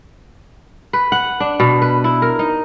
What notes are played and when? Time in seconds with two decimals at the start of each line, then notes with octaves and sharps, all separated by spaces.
0.93 B4
1.12 F#5
1.40 D4
1.60 B2
1.82 B4
2.04 E4
2.22 A#4
2.39 D#4